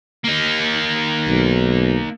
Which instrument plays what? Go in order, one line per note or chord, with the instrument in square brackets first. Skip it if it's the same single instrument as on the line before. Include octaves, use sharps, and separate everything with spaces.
[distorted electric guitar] A#3 D#4
[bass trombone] B1